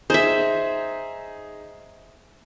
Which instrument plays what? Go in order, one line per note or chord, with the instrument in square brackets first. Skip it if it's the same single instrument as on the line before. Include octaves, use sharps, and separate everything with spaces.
[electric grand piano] D#4 G#4 [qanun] C5 E5